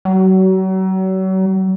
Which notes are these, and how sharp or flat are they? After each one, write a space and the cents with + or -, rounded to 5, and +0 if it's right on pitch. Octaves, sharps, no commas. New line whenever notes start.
F#3 +35